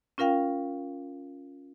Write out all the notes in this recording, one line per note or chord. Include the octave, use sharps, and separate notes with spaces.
C#4 F4 A#4 F5 G5